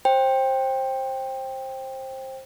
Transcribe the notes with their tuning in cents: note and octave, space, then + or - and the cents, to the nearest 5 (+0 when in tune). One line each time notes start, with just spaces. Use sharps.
C5 +20 G5 +10